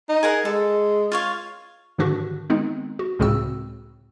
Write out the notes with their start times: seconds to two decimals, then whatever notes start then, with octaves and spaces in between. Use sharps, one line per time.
0.09 D#4
0.23 G#4 A#4 F#5
0.45 G#3 A4
1.12 F4 C#5 F5
1.98 G#2 D3 D#3 D4 F#4 G4
2.50 D#3 G#3 B3 C4 D#4
2.99 F#4
3.19 C#2 A2 C#3 C4 F#4 E6